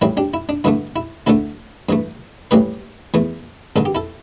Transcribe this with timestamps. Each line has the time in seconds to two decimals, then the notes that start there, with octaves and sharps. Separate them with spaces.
0.01 A1 A2 G3 E4
0.17 D4 G4
0.34 E4
0.49 D4
0.64 G2 D3 A3 E4
0.96 E4
1.26 D2 D3 A3 E4 A4
1.89 G2 E3 A3
2.51 A1 A2 E3 G3 G4 B4
3.14 E2 E3 A3
3.76 A1 G2 D3 A4
3.85 G4
3.95 E4 A4